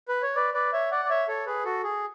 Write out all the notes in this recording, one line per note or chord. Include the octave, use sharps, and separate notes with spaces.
B4
C#5
B4 D5
B4 D5
C#5 E5
D5 F#5
D5
C#5 E5
A4 C#5
G#4 B4
F#4 A4
G#4